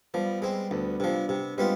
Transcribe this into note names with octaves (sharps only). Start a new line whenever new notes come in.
F3 G3 B3
G#3 C4
D2 B3 D4
C3 F3 B3 D4
C3 B3 D4
G3 G#3 B3 C4 F4